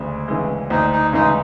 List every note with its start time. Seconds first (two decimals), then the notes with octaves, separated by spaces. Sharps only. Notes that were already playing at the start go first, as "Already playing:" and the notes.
Already playing: D2 C#3 G#3
0.28 C#3 E3 G#3
0.70 D2 D#4
0.92 D#4
1.13 C#3 E3 G#3 D#4